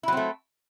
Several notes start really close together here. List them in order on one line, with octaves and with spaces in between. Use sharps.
E4 F#3 C4 A3